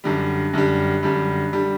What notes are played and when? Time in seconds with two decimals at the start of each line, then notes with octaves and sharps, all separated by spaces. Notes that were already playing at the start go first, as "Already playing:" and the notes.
0.04 F#2 D3 G3
0.53 F#2 D3 G3
1.03 F#2 D3 G3
1.53 D3 G3